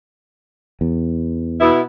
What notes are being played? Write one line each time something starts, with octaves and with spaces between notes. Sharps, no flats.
E2
B2 B3 E4